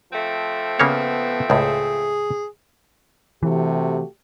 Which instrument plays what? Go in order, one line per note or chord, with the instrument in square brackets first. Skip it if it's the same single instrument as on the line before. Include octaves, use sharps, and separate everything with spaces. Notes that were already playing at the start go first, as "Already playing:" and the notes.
[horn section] F3 A3 C4
[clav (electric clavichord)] C#3 A#3 C#5 [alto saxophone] B3
[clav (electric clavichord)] C#2 A2 [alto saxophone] G#4
[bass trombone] C3 [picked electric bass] E3 [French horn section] A3 F#4 G4